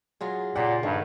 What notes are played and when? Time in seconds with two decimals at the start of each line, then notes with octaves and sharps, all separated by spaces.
0.21 F#3 F4 G#4
0.56 A#2 C#3 G4 F#5
0.83 G2 D#3 A3